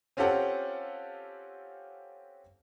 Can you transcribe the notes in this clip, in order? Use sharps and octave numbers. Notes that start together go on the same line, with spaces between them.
C4 C#4 F4 G4 A4 F#5